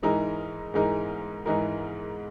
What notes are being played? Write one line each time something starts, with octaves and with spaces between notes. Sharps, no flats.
G#2 E3 G#3 D#4 A#4
G#2 E3 G#3 D#4 A#4
G#2 E3 G#3 D#4 A#4